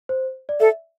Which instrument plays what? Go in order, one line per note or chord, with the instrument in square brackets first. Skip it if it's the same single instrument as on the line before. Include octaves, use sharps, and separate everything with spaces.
[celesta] C5
D5
[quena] A4 [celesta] E5